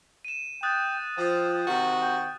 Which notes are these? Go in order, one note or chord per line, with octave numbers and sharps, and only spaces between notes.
D#7 E7
G5 D#6 F#6 A6
F3 G5
C3 D#3 F#4
G5